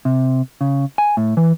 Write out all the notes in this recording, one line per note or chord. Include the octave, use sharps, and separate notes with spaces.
C3
C#3
G#5
A2
E3